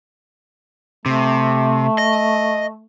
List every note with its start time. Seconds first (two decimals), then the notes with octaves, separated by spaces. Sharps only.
1.06 C3 A3
1.98 D#5